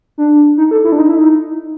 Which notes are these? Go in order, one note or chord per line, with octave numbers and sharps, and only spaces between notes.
D4
D#4
A4
E4
D4
D#4
E4
D#4